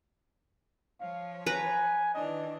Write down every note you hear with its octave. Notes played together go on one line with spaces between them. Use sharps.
F3 C#5 F5
B4 G#5 A#5
D#3 E3 D4 D#5